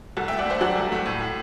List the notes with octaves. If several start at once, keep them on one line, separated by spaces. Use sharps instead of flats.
C2 F#4 A4
E5 G5
A3
D5 F#5
A3 C5 E5
F#3 D5 F#5
C2
A3
A2
A2